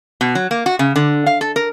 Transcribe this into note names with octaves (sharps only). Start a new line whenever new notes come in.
B2
F#3
A#3
F#4
C#3
D3
F5
A4
A#4